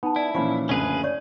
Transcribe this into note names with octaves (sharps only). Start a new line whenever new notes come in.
B3 D#4 A5
E4 D5
A#2 E3 F3 C#4 G#5 B5 C#6
F#1 D2 C#4 G#4 B4
C#5 D5 C#6